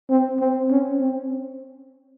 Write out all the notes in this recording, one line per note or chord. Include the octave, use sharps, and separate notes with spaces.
C4
C4
C#4
C4